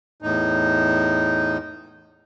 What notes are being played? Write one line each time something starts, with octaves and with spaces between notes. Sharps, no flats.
E2 A2 D#4